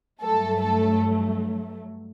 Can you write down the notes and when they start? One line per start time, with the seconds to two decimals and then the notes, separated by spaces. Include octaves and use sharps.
0.21 G2 F#3 A3 A4
0.61 A4